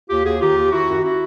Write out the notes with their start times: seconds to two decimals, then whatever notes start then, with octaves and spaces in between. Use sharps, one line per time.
0.09 D#2 F4 G4
0.24 D#2 F#4 G#4
0.41 D#3 F4 G4
0.55 D#2
0.71 D#3 E4 F#4
0.87 F#2
1.03 E4 F#4